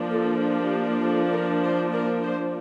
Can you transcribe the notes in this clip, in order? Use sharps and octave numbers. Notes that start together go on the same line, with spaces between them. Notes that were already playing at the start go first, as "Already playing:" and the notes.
Already playing: F3 A#3 D4
A4
G4
A4
A#4
C5
A#4
C5